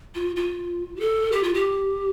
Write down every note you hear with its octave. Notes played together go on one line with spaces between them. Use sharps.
F4
F4
G4
A4
G4
F4
G4